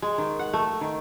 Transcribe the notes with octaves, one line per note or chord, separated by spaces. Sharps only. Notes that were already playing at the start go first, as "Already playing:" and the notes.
G#3
D#3
F#5
A3
D#3